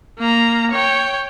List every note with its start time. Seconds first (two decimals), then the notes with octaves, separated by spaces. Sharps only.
0.19 A#3 A#5
0.71 C#5 G5